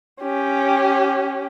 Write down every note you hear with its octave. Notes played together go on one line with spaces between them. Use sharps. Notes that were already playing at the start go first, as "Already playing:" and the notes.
C#4 G4